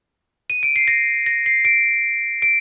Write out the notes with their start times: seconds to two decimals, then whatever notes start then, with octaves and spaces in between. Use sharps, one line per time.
0.50 D#7
0.63 D7
0.76 C7
0.88 A#6
1.26 A#6
1.46 C7
1.65 D7
2.42 D7